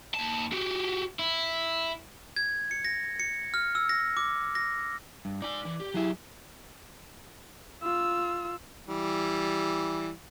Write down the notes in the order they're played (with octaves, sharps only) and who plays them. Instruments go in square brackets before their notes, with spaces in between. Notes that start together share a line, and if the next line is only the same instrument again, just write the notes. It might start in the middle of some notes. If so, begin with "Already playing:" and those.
[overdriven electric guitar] D#2 A5
F#4 G4
E4
[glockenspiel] G#6
C#7
A#6
C#7
F6
E6
A#6
D6
A#6
[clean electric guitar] G2
[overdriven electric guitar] D#4 G#5 [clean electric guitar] D5
[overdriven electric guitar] E3
G4
[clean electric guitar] F#3 G#4 E5 [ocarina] E4
[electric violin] F4 E6
[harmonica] E3 G3